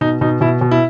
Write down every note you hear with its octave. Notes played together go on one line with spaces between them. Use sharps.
B2 D#4
B2 D#4
B2 E4
B2
E4